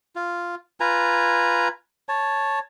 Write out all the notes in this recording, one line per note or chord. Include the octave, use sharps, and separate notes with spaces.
F4
F4 B4 G#5 A#5
C#5 A5